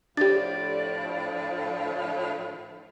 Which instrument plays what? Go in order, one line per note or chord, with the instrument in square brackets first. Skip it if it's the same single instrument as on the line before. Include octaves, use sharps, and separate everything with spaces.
[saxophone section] A2 D3 F3 [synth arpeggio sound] D4 G4 [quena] D5 [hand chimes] A6